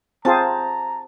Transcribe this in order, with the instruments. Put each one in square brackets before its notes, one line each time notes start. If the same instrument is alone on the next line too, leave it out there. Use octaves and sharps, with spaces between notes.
[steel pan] C4 F4 G#4 [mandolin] A5 [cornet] A#5